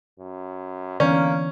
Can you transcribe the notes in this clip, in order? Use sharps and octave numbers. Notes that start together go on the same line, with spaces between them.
F#2
D3 E3 A#3 B3 C#4 D5